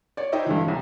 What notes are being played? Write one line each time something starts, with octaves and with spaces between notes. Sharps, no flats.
C#5 D5
D#4 E4 C5 D#5 G5
G2 D3 E3
E1 C2